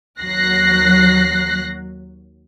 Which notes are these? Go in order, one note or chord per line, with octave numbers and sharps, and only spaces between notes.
D#2 F#3 F#6 A#6 C7